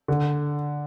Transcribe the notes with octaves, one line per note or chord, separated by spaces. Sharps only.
D3